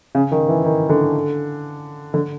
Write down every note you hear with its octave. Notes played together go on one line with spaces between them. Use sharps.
C#3
D#3
E3
D#3
D3
D3